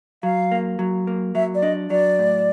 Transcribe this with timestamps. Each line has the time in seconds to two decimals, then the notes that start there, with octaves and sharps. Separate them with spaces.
0.23 F#3 F5
0.52 A#3
0.79 F#3
1.07 A#3
1.35 F#3 E5
1.55 D5
1.63 D4 D#5
1.90 F#3 D5
2.19 A2